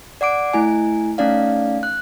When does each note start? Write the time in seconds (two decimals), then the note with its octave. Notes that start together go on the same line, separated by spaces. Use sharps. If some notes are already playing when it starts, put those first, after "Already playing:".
0.21 D5 F#5 D6 D7
0.53 A3 E4 G#5
1.18 A3 C#4 D#4 D5 F5
1.83 F#6